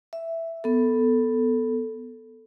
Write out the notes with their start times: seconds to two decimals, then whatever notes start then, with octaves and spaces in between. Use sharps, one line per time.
0.13 E5
0.64 B3 A4